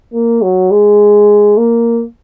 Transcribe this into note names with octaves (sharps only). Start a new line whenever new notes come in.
A#3
F#3
G#3
A#3